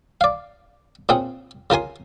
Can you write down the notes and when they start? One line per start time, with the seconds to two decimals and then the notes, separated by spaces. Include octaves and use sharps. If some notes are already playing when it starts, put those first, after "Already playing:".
0.21 D5 F5
1.09 A#2 C4 C#4 G#4
1.70 C#3 F4 A#4 G#5 C6